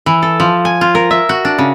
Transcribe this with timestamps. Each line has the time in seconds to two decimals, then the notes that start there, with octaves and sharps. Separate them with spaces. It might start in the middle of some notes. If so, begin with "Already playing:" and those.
0.06 E3
0.22 A4
0.40 F3
0.65 G#5
0.81 F4
0.95 A#4
1.11 E5
1.29 F#4
1.45 D4
1.58 C#3